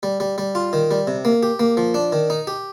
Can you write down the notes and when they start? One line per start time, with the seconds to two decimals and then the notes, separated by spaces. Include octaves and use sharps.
0.03 G3
0.20 G3
0.38 G3
0.55 F4
0.73 D#3
0.91 G3
1.07 C3
1.25 A#3
1.43 G4
1.60 A#3
1.77 F3
1.94 D4
2.12 D#3
2.30 D#4
2.47 G4